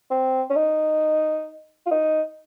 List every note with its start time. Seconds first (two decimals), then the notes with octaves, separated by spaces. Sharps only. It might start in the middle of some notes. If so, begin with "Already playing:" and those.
0.11 C4
0.50 C#4
0.56 D#4
1.87 F4
1.91 D#4